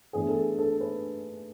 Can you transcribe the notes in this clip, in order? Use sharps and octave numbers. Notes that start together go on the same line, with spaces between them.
A2 E3 B3 D4 G#4
A4
G#4
A4
B4